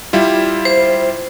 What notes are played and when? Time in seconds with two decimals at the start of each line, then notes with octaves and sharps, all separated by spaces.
0.13 G3 E4 F4
0.65 C5